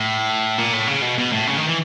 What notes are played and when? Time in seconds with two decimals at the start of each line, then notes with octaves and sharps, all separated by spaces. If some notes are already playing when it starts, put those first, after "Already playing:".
Already playing: A2
0.58 A#2
0.74 A2
0.87 C#3
1.02 B2
1.18 B2
1.32 A2
1.47 C#3
1.57 D#3
1.67 E3